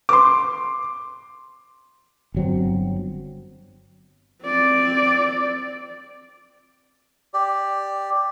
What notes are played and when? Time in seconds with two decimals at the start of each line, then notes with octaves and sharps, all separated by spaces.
0.09 C6 D6
2.34 G1 F#3 C4
4.44 C4 D5
7.34 G4 D5